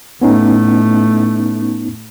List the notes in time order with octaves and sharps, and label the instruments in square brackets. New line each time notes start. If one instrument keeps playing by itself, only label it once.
[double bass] A2 A3 [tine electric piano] B3 C#4 D#4